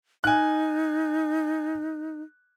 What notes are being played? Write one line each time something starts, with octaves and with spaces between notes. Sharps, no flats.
D#4 G#5 F#6